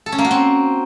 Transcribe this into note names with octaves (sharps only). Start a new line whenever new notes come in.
A4
C#4
A#3
F#4
C4